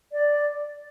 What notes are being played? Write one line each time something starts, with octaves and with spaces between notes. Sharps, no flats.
D5